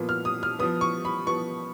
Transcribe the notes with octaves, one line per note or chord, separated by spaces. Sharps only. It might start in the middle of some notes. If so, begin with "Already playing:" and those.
Already playing: A#2 F3 B3
F6
D#6
F6
F3 B3 D#6
C#6
B5
F3 B3 C#6